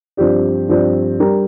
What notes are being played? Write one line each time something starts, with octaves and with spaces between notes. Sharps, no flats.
G2 F3 C4 G4 D5
G2 F3 C4 G4 D5
G3 D4 G4 A#4 D5